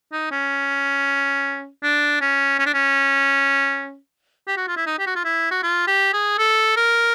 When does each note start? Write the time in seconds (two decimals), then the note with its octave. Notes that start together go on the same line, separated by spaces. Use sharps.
0.12 D#4
0.31 C#4
1.83 D4
2.21 C#4
2.59 C#4
2.66 D4
2.74 C#4
4.48 G4
4.57 F#4
4.68 F4
4.77 E4
4.86 D#4
4.99 G4
5.07 F#4
5.16 F4
5.25 E4
5.51 F#4
5.63 F4
5.87 G4
6.13 G#4
6.38 A4
6.77 A#4